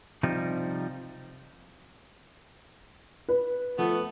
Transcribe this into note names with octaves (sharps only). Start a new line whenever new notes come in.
C3 F3 G3 D#4
B4
F3 A3 B3